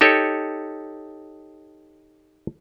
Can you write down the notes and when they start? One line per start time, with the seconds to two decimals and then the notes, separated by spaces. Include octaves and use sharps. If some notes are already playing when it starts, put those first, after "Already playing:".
0.01 D#4 G4 A4 C#5